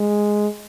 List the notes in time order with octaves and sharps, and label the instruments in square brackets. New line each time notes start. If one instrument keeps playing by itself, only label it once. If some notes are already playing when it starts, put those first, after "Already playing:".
Already playing: [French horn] G#3